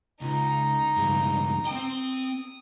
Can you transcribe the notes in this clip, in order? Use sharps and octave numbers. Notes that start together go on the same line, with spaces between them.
C#2 D#4
C#2 G2
C4 G5 D#6